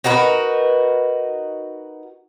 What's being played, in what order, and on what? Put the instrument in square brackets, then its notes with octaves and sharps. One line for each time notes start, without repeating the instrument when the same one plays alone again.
[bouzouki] D#4 F#4 A#4 B4